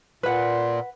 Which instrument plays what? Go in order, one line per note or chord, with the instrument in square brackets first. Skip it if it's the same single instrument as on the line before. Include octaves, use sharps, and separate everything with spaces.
[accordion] A#2 [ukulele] B4 F#5